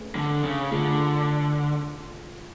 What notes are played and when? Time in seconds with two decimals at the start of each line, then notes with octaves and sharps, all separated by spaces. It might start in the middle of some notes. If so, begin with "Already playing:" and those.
Already playing: A3 C#4 G#4 B4
0.15 D3
0.44 C#3
0.71 D3 A3 F4 G#4